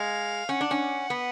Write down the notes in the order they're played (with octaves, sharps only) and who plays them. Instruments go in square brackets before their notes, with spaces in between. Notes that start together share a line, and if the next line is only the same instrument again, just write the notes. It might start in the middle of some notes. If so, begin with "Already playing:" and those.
Already playing: [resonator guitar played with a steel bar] G#3 [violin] F5
[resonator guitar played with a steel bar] C#4 [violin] F#5
[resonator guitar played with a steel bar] D4
C#4
[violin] F#5
[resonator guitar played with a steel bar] B3